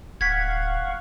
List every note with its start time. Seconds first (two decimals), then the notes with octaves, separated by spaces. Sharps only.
0.21 D1 F5 F#5 C#6 G#6 B6